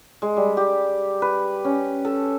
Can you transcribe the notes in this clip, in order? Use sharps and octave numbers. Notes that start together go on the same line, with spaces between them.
G#3
G3
G4
B4
C#4
A4